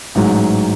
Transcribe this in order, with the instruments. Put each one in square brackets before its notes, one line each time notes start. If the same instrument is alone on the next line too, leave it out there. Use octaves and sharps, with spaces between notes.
[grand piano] A1 G#2 F#3